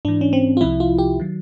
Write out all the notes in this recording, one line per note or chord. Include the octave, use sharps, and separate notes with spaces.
G#2 E3 D4
C#4
C4
F4
C2 C3 F3 E4
F4
G4
D#3 F#3